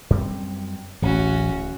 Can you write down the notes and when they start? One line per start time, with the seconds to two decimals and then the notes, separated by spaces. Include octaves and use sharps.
0.10 F#2 G3 C4
1.02 D1 A1 C#4 F#4